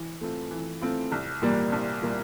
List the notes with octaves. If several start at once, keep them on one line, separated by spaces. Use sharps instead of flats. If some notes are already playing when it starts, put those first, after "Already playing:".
Already playing: E3
A3 C4 F4
E3
A3 C4 F4
C2
A#2 G3 A#3
C2
A#2 G3 A#3